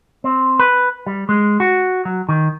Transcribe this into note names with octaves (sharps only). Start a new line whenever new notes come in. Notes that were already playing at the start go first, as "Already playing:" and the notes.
C4
B4
G3
G#3
F#4
F#3
D#3